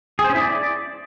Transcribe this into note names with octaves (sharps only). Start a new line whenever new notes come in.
G#4
C5
C#4
E4
D5